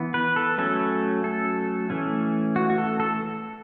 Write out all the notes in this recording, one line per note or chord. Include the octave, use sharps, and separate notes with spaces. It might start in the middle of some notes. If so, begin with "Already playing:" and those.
Already playing: E3 B3
B4
A4
F#3 A3 C#4 A4
A4
E3 A3 C#4
F#4
F#4
A4
A4